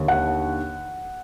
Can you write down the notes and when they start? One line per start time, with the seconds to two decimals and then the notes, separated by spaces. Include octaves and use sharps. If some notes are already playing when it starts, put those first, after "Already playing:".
Already playing: D#2 D3
0.08 F#5